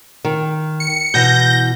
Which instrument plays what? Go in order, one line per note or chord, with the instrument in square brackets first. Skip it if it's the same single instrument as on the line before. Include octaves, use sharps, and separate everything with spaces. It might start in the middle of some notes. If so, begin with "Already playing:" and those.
[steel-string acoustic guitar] D#3
[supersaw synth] C#7
[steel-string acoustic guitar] B2 E3 [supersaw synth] G6 A#6